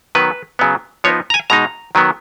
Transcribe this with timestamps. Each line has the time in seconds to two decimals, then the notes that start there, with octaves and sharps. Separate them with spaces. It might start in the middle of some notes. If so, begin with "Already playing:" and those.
0.15 D#3 F#3 B3 B4
0.59 C#3 F#3 B3
1.04 F3 B3 D#4 C#5
1.30 A#5
1.34 G#5
1.50 B2 G#3 D#4 A#5
1.95 D#3 F#3 B3